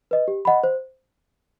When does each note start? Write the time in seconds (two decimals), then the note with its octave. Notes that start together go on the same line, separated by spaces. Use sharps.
0.11 B4 D#5
0.28 G4
0.45 D#5 F#5 B5
0.64 C5